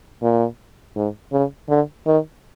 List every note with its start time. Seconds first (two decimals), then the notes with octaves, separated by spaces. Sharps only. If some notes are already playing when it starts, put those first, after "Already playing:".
0.22 A#2
0.96 G#2
1.32 C#3
1.69 D3
2.06 D#3